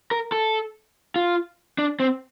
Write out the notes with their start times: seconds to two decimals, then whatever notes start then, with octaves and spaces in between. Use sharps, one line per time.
0.11 A#4
0.32 A4
1.16 F4
1.78 D4
2.00 C4